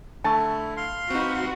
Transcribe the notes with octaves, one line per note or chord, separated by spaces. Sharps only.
D3 A3 E4 A5 C#6 A6
F5 C6
C4 D#4 F#4 B4